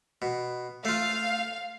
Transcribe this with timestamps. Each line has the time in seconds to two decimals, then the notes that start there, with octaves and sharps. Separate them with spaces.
0.22 B2
0.85 A3 F4 F5